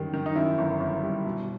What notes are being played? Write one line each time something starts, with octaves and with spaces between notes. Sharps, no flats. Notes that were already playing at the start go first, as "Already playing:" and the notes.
Already playing: F#2 D#3 G3
D#3
D#4
F#2 E4
G1
G1
G3
B2